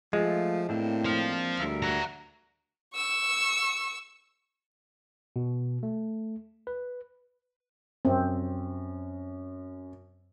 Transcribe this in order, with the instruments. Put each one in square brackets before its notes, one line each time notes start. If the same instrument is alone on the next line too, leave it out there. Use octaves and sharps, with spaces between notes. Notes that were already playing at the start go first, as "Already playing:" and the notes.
[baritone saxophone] F3 [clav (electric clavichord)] G#3 [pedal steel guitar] A3 F4
[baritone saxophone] A2 [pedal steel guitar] A#3 C4 D4
[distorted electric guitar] C5 F5
[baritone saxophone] D2 [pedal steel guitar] G3 A#4 E5
[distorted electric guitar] F#5 A#5
[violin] C#6 E6
[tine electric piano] B2
A3
B4
[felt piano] F#2 [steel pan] C4